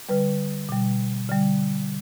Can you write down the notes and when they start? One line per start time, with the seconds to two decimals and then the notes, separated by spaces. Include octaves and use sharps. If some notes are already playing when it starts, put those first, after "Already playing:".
0.09 D3 G3 B4
0.69 B2 G3
1.29 D3 G3